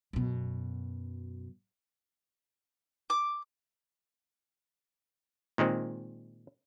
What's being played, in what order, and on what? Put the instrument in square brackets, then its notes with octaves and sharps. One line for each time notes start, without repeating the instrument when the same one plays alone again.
[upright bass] F#2 B2
[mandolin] D6
[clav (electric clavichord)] A#2 D#3 G#3 C4